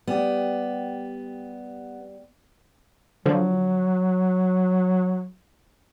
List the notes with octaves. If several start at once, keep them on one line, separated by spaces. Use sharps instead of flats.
G3 B3 G4
D3 F3 F#3